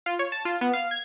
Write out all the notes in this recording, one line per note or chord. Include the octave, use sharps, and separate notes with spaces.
F4
C#5
A5
F4
B3
F5
G#6